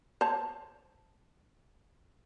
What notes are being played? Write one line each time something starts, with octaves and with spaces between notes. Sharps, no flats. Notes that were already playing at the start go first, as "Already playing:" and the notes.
C5 C#5 A5